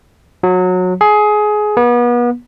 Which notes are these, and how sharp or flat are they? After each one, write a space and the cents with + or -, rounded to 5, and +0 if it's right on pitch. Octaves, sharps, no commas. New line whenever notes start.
F#3 -20
G#4 +20
B3 -35